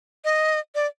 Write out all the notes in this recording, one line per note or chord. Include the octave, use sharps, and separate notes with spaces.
D#5
D5